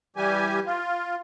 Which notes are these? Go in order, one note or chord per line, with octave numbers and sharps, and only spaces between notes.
E3 G3 G4 G#5
F4